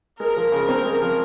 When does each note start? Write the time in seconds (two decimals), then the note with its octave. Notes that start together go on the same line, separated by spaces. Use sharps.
0.20 G#3 A#4
0.37 F3
0.52 C#3
0.68 C4
0.85 G#3
1.02 F3